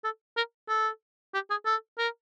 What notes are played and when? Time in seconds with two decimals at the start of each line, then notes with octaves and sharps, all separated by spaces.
0.04 A4
0.37 A#4
0.69 A4
1.34 G4
1.50 G#4
1.65 A4
1.98 A#4